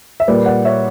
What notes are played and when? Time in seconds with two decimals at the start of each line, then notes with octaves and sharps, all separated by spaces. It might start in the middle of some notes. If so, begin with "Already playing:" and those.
0.20 E5
0.28 A#2 G3 B4 D5
0.46 D5 F#5
0.65 C#5 E5